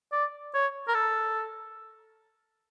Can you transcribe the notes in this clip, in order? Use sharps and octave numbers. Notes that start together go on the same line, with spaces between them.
D5
C#5
A#4
A4